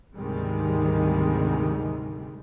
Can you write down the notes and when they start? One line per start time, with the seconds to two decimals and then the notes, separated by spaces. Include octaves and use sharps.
0.15 D2 G#2 C3 D#3 G3 G#3